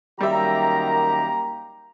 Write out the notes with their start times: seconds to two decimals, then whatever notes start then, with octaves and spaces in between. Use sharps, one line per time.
0.21 F#2 D#3 G3 A#3 G4 E5 A#5